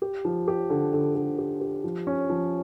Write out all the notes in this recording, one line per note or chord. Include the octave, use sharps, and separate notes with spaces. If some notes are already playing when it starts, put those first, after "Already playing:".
G4
F3
G4
D3
D3
D3
G4
G4
F3
C#4
F3